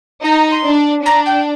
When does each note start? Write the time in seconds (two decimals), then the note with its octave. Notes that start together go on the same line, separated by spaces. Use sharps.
0.24 D#4 A#5
0.51 C6
0.65 D4
1.05 D4 A#5
1.26 G5